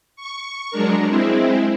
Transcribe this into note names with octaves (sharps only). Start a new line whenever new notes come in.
C#6
F#3 G#3 D4 A#4
G#3 C4 E4